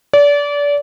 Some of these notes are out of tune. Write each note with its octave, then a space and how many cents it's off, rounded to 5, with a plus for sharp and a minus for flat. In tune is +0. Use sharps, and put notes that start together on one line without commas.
D5 -30